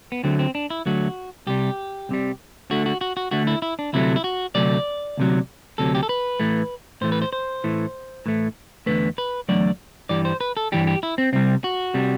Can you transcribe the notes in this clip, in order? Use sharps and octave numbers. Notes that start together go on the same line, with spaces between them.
B3
D2 D3 F#3 A3 C4
C4
D4
E4
D2 D3 F#3 A3 F#4
C2 C3 G3 G4
C2 C3 G3
D2 D3 A3 F#4
F#4
F#4
F#4
D2 D3 A3 F#4
E4
E4
D4
D2 C3 F#3 A3 E4
E4
F#4
D2 C3 F#3 A3 D5
D2 C3 F#3
D2 C3 F#3 A4
G4
A4
B4
A2 E3 A3
A2 E3 A3 C5
B4
C5
C5
A2 E3 A3
A2 E3 A3
E2 D3 F#3 A3 B4
B4
E2 D3 F#3 A3 D5
G2 E3 G3 D5
C5
B4
A4
G2 E3 G3 G4
G4
E4
C4
C2 C3 G3 C4
F#4
C3 G3